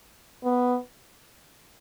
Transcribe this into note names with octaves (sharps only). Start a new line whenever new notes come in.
B3